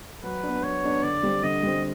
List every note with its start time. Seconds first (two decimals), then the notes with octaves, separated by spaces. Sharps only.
0.23 F#3 B4
0.43 B3 D4
0.63 F#3 C#5
0.83 B3 D4
1.03 D3 D5
1.23 G3 C4
1.43 D3 D#5
1.63 G3 C4